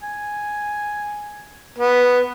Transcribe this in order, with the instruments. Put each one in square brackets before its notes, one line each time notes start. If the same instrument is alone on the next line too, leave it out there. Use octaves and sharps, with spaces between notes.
[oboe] G#5
[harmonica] B3